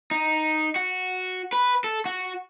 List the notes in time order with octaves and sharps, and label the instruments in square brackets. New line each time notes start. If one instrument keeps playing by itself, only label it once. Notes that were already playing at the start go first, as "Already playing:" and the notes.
[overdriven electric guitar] D#4
F#4
B4
A4
F#4